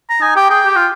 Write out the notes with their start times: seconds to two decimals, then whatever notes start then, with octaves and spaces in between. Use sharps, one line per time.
0.10 A#5
0.21 D#4 G#5
0.36 G4 G5
0.50 G#4 G5
0.66 G4
0.76 F4